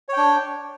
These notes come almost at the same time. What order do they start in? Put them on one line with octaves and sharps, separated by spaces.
C#5 G5 D4